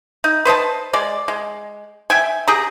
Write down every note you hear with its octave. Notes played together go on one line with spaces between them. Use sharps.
D#4
B4 C5 D#5 A5
G#3 D5
G#3
E5 G5 G#5
G4 G#4 A#5